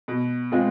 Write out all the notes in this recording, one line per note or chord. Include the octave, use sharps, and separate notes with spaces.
B2
G#3 C4 F4 G#4